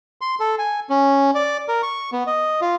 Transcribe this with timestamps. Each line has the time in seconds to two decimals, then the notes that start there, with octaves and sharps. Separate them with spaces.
0.21 C6
0.40 A4
0.59 G#5
0.89 C#4
1.35 D5
1.68 A#4
1.83 C#6
2.12 B3
2.27 D#5
2.61 F4